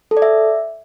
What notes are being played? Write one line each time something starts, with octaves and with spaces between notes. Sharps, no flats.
A4
D5
E5